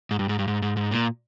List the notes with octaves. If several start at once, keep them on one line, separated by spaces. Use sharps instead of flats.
G#2
G2
G#2
G2
G#2
G#2
G#2
A#2